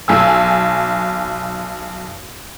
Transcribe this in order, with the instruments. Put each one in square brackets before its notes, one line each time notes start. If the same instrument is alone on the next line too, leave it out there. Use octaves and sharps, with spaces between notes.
[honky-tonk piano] B1 G#5 E6